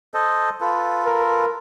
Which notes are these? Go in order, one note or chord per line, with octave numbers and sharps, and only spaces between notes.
A4 C5 D#5
F4 A4 B4
A#4